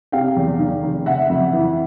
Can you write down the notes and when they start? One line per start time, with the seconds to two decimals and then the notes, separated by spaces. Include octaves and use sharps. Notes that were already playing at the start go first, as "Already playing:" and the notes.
0.12 C3 F5 G5
0.37 E2
0.59 D#3
0.83 F1
1.06 C#3 E5 F#5
1.30 F2
1.53 E3